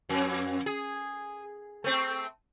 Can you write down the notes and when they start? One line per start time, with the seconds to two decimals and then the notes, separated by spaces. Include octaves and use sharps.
0.09 F2
0.66 G#4
1.84 A3 C4